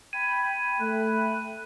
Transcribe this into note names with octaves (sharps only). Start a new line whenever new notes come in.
G5 B5 G#6 D#7
A3 F#6